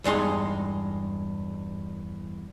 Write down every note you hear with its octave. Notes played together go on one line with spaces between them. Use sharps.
E2 G2 G#3 D#4 C6